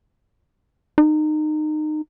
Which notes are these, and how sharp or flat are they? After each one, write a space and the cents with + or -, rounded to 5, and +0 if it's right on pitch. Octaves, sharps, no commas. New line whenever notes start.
D#4 -25